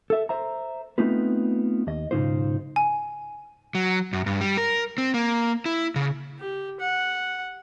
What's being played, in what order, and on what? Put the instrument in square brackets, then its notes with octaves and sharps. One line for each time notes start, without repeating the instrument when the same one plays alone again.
[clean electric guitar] A4 E5
C5 E5 A#5
A3 B3 C4 D#4 F4 B4
D#2 D#5
B1 G#2 C#3 D#4 F4 C5
[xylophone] G#5
[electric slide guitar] F#3
F#2
G2
G3
A#4
C4
A#3
E4
C#3
[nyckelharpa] G4
F#5